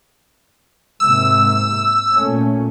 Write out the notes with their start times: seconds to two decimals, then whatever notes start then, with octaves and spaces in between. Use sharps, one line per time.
1.00 G#2 C3 A#3 E6
2.13 A#2 A3 C#4